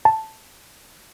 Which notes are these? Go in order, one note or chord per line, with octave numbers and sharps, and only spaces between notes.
A5